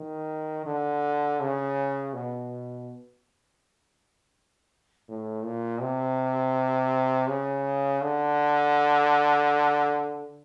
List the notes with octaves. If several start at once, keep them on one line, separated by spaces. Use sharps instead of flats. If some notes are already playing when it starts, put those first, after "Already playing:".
Already playing: D#3
D3
C#3
B2
A2
A#2
C3
C#3
D3